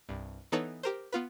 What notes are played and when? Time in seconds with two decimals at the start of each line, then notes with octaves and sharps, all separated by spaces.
0.09 C2 G2
0.52 E3 B3 D#4 A4 B4 C#5
0.83 G4 A#4 C5
1.13 B3 F4 B4